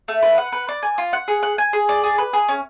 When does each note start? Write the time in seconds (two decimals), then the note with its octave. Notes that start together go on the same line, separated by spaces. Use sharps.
0.08 A3
0.23 B4
0.38 F#5
0.52 B4
0.68 D5
0.83 G#5
0.98 F4
1.13 F#5
1.28 G#4
1.43 F#5
1.58 G#5
1.73 G#4
1.89 D5
2.03 G#4
2.18 B4
2.33 G#4
2.48 C#4